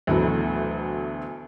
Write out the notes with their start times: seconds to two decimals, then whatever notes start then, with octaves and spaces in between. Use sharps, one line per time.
0.07 D2 B2 E3 F#3 A3